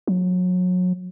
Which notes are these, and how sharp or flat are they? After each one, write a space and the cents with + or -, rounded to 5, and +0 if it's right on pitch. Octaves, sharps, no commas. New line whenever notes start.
F#3 -30